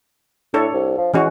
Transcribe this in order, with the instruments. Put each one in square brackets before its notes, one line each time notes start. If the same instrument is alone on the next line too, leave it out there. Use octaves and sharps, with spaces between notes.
[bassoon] A2 [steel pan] D4 A4 C#5
[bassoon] C2
F3
[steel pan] E3 C#4 F#4 [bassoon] G#3